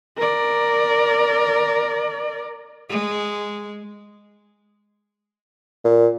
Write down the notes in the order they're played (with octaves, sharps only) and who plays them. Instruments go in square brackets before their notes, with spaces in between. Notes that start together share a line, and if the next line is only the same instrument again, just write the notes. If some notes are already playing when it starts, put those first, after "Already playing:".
[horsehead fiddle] A#4 D5
[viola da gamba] G#3
[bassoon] A#2